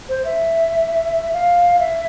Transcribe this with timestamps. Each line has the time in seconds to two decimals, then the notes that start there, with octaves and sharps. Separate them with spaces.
0.09 C5
0.24 E5
1.33 F5
1.79 E5